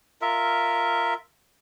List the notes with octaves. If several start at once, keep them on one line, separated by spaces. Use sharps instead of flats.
F4 A#4 E5